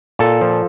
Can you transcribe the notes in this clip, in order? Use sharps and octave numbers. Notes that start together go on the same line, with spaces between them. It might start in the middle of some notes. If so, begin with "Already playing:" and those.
A#2 A4
F3